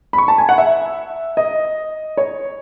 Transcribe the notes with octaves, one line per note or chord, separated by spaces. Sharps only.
B5
C#6
A5
G#5
F#5
E5
D#5
C#5